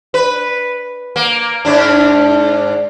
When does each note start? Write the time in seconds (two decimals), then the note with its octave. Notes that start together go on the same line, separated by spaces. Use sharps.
0.14 B4
1.16 A#3
1.65 G#2 D4